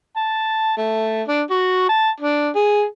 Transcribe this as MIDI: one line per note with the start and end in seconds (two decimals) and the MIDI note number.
0.16 0.76 81
0.77 1.23 57
1.28 1.42 62
1.50 1.85 66
1.89 2.09 81
2.20 2.49 62
2.55 2.83 68